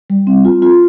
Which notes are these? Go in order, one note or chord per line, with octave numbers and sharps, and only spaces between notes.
G3
C4
F4
F4